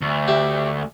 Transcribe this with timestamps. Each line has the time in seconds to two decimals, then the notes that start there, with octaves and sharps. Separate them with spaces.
0.01 D2
0.28 G4 E5